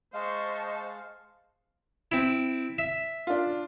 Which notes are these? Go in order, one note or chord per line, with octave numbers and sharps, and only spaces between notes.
G#3 C5 D#5 F5 A5 C#6
C4 E4
E5
D4 F4